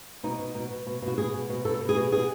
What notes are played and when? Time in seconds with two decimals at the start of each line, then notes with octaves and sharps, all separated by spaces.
0.23 B2 D#4
0.39 B2
0.55 B2
0.71 B2
0.87 B2
1.02 B2
1.07 F#4
1.18 B2 G#4
1.33 B2
1.49 B2
1.65 B2 A4
1.81 B2
1.89 G#4
1.96 B2
2.12 B2 G#4